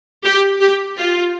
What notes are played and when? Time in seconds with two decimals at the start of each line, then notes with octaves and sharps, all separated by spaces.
0.24 G4
0.60 G4
0.97 F4